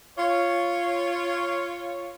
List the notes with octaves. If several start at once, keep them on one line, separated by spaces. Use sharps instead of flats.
F4 C#5